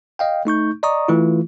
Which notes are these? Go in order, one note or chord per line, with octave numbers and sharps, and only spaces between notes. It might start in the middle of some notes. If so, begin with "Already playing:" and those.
D#5 F5 G5
A3 D#4 C#6 G6
D5 D#5 A#5 C#6 D#6
E3 A3 E4 F4